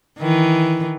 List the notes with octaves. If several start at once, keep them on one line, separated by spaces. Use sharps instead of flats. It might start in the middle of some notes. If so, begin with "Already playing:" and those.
D#3 E3